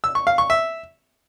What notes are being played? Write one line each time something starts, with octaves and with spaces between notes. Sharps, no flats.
E6
C#6
F5
C#6
E5